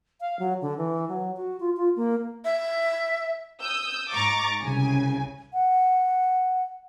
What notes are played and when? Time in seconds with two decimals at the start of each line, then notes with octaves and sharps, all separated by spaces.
0.21 F5
0.39 F#3
0.62 D3
0.78 E3
1.09 F#3
1.37 F#4
1.60 F4
1.77 F4
1.96 A#3
2.45 E5
3.62 D#6 E6 G6
4.11 G#2 A#5 C#6 D6 A6
4.62 C2 C#3 G#5
5.53 F#5